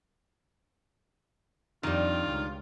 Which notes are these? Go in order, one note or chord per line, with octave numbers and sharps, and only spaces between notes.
F2 D#3 G3 D4 F4
C#2